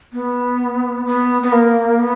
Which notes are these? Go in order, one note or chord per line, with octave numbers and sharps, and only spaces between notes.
B3
B3
B3
A#3
B3